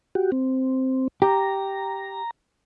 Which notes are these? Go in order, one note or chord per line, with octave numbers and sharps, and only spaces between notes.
F#4 G4
C4
G4 A#5